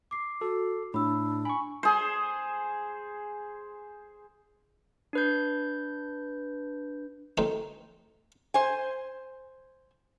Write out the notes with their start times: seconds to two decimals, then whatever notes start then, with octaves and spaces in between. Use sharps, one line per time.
0.11 D6 C7
0.41 F#4 A4
0.94 A2 D4 B5 E6
1.45 G#5 B5 C#6
1.83 G#4 C5
5.13 D4 B4 G6
7.37 F#2 A2 D#3 A3 C4 D#4
8.54 C5 G#5